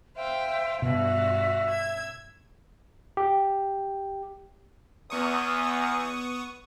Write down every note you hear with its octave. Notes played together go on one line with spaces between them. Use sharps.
C5 E5 F5 G5
G2 B2 F#4 E5 F5
E6 G#6
G4
E2 B3 C#6 D#6